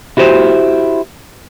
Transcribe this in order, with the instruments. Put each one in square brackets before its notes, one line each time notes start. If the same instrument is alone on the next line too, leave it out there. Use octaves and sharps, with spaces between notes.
[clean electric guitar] E4 F#4 G4 B4 C5